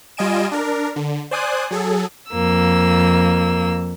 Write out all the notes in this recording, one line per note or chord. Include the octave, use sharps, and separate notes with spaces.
G3 F4 D#5 G#5 D7 E7
D4 A#4
D3
C5 D5 G#5 D#6 F#6
F#3 G#4 A4
F2 A#3 E6